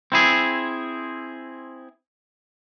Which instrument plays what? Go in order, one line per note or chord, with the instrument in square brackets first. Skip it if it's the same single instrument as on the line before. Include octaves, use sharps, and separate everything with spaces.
[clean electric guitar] C4 E4 G#4